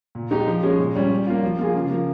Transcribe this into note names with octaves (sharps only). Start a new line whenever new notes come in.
A#2
G#3 D#4 G4
F3
G#3 C#4
A#2
G3 C#4
G3
A#3 F4
F3
A#3 F4 G#4
C#3
F3 A#3